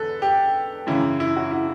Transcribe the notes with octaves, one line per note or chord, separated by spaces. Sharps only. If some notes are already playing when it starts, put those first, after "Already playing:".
Already playing: E2 D3 A4 B4
G4
F#2 C#3 E3 E4
E4
F#4
E4